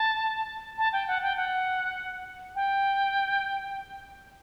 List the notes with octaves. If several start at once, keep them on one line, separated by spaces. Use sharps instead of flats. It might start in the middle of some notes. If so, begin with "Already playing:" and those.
Already playing: A5
A5
G5
F#5
G5
F#5
G5